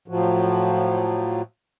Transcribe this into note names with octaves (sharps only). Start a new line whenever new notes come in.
A2 F3 F#3